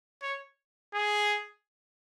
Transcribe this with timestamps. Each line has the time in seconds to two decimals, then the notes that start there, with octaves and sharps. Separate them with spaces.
0.22 C#5
0.94 G#4